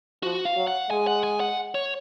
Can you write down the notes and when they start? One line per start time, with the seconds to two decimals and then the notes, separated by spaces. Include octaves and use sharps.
0.23 F3 F#4
0.45 F5
0.57 F#3
0.67 F#5
0.91 G#3 G#5
1.07 F#5
1.24 G#5
1.40 F#5
1.75 C#5